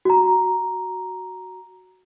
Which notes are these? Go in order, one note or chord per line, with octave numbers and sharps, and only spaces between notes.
F#4 A#5